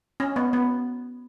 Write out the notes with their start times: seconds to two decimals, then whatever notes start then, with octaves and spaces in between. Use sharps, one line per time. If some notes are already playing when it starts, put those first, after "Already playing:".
0.20 C#4
0.36 B3
0.53 B3